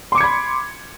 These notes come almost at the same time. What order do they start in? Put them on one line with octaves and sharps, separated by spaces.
C6 D6 C#7 G#6 B5